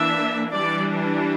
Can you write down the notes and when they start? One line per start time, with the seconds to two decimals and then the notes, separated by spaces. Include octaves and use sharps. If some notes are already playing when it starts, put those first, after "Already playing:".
Already playing: E3 A#3 D4 E5
0.55 E3 G3 D4 D5